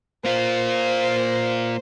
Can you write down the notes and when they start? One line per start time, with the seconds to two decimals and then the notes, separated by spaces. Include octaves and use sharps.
0.25 A#3 F4 C5